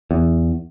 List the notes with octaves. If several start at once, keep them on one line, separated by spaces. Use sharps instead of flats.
E2